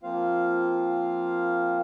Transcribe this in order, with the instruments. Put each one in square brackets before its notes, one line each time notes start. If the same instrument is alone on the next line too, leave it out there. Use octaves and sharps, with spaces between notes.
[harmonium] F3 A#3 C4 F4 C5 F5